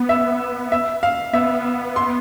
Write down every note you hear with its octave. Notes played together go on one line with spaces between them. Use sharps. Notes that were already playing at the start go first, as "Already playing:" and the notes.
Already playing: B3
E5
E5
F5
B3 E5
C6